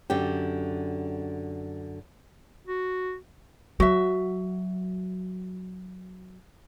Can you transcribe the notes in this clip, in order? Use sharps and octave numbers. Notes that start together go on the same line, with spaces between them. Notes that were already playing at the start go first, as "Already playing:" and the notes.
F#2 D3 G4
F#4
F#3 F#4 E5